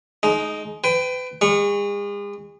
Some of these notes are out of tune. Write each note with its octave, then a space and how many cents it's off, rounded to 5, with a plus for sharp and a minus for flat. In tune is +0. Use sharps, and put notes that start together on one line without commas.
G#3 +30 D#4 +0
B4 +35 G5 +0
G#3 -40 C#6 +0